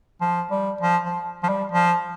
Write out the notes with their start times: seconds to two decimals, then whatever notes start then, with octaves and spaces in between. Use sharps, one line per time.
0.21 F3
0.51 G3
0.81 F3
1.04 F3
1.43 F3
1.49 G3
1.72 F3